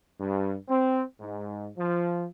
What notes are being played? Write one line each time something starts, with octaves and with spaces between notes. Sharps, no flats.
G2
C4
G#2
F3